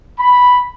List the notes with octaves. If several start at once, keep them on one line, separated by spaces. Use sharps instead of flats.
B5